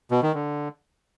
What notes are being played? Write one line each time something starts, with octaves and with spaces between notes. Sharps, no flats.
B2
D#3
D3